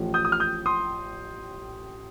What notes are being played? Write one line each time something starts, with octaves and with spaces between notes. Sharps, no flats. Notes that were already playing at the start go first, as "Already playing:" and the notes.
Already playing: A1 A2 F3
D#6 G6
D#6
F6
D#6 G6
C6 D#6